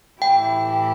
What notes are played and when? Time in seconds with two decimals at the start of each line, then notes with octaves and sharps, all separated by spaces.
0.22 A2 E3 A3 E4 G4 G5